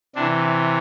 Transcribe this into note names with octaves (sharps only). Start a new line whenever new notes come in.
C3 E3 D4